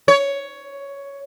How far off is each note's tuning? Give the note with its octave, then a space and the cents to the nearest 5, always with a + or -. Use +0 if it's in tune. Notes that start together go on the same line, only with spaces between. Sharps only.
C#5 +10